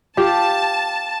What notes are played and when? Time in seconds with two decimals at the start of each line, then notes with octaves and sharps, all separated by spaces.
0.17 F4 G4 A5